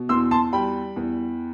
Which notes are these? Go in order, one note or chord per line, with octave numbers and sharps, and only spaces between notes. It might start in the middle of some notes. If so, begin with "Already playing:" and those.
Already playing: B2
E2 C6 E6
A5 C6
G3 G5 B5
E2